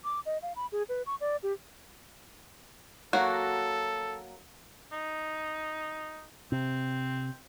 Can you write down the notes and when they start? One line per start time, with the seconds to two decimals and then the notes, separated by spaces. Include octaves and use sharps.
0.04 D6
0.26 D#5
0.42 F5
0.56 B5
0.72 G#4
0.89 B4
1.06 C#6
1.21 D5
1.43 G4
3.13 F#3 A#3 F#4 A4
4.92 D#4
6.52 C3 C4